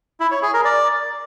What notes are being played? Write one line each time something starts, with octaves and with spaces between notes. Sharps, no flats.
E4
C#5
G#4
A#4
D5